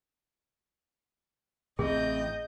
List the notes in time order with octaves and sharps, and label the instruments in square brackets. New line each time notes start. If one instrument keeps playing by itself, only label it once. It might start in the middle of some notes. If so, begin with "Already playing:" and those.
[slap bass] A1 A2 C3 [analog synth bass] C4 [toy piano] G#4 [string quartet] D#5 G6